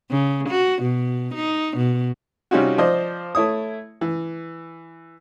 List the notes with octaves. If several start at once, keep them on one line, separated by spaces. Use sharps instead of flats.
C#3
F#4
B2
D#4
B2
C3 G3 C#4 D#4 F4 F#4
F3 C5 D5 D#5
A3 E4 C#5 D#6
E3